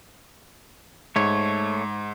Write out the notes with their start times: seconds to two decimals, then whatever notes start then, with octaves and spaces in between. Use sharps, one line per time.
1.16 G#2 A3 C#5